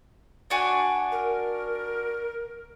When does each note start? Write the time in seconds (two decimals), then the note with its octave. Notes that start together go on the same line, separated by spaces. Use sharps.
0.50 D4 F#4 G#5
1.12 A#4